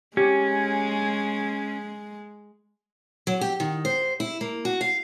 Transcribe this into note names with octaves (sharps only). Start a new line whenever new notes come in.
G#3 C#4 G4
F#3
G4
D#3
C5
E4
A#3
F#4
F5